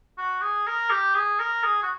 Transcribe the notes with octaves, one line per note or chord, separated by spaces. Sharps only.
F#4
G#4
A#4
G4
G#4
A#4
G#4
F#4